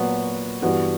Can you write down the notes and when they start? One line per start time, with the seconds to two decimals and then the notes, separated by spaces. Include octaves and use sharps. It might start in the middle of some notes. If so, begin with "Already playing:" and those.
Already playing: A#2 F#3 B3 F#4
0.62 G2 E3 B3 F#4